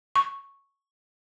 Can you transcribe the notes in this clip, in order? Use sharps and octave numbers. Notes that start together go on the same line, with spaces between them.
C#6